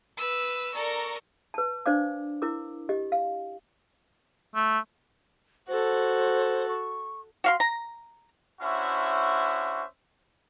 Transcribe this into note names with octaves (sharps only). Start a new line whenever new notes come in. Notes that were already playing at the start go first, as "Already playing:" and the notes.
B4 E6
A4 A#4 D5 A#5 C#6
B4 A5
D4 C5 D5 F5 D6
E4 A#4 D6
G4 D#5
F5
A3
F#4 A4 C5
C#6
F#4 F5 C6
A#5
C#4 D4 E4 F#4 C5 E5